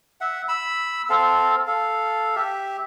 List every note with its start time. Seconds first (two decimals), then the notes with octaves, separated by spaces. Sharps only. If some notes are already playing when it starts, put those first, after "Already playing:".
0.21 E5 F#5
0.48 B5 E6
1.10 C4 A4 F5
1.67 A4 F5
2.36 G4 E5